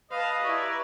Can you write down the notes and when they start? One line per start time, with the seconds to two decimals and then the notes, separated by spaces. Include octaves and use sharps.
0.11 B4 D#5 F5 A5
0.42 E4 G4 D5 A#5 C#6